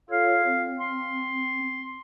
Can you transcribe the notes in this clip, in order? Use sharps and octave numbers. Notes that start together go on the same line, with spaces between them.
F4 A4 C#5 F5
C4
C6